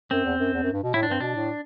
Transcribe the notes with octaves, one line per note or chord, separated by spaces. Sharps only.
F#2 C4
E2
F#2
E2
F#2
G2
B2
A2 E4
D4
G2 C4
B2 D4
A2